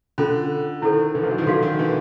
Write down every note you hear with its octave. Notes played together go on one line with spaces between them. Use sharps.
D3 C#4 F4 A4
D#3 E4 A4 C5
D3 E3
D#3 F3
E3 F#3
D#3 F3
D3 F#4 A4 D5 F5
D#3
D3 E3